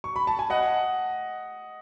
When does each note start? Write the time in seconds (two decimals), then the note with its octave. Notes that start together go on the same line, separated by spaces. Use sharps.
0.04 C#6
0.16 B5
0.27 A5
0.39 G#5
0.50 D#5 F#5